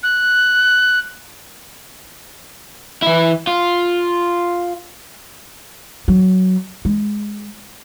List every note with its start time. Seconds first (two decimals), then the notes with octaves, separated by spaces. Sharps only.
0.03 F#6
3.02 E3 E4
3.47 F4
6.08 F#3
6.85 G#3